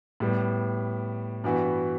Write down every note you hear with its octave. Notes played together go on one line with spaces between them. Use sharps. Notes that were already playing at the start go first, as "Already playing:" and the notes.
A2 G3 B3
G2 E3 B3 F#4